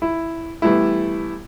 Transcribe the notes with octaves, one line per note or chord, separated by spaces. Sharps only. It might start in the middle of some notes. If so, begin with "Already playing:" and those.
E4
E3 G3 A3 B3 E4